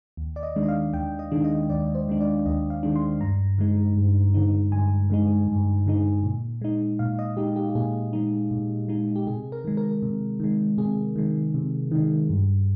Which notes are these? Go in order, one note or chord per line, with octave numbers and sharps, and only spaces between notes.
D#2
D5
D#5
D#3 G#3 D4
D#5
F5
D#2 G5
D#5
D#3 G#3 D4
D#5
D#2 D5
C5
D#3 G#3 D4
D5
D#2 D#5
F5
D#3 G#3 D4
C6
G2 A#5
D3 G#3 D#4
G2
D3 G#3 D#4
G2 G#5
D3 G#3 D#4
G2
D3 G#3 D#4
A#2
G#3 D#4
A#2 F5
D#5
G#3 D#4 G4
G4
G4
A#2 G#4
G#3 D#4
A#2
G#3 D#4
G4
C3 G#4
A#4
D#3 G#3
A#4
C3
D#3 G#3
C3 G#4
D#3 G#3
C3
D#3 G#3
G2